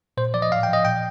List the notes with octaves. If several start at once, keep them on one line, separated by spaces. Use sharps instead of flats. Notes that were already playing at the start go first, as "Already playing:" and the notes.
A#2 C5
F3 D5
D#5
A2 F5
G5
F3 D#5
A#2 G5